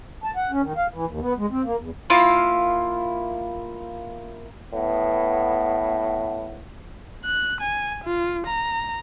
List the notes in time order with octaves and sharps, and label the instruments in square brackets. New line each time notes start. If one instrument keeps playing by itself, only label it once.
[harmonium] A5
F#5
C#4
D#3
F5
E3
D#2
B3
G#3
C4
A#3
E2
[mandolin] A#3 E4 F4 F5
[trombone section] A2 B3
[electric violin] F#6
G#5
F4
A#5